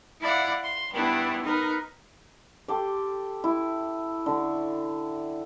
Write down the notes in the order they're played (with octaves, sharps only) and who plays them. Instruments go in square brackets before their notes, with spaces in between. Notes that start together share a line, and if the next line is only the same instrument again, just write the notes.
[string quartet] E4 D5 F5 F#5
C6
G2 B3 D4 E4
D#4 A#4 B4
[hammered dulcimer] G4 A4 C6 D6
E4
D3 C#6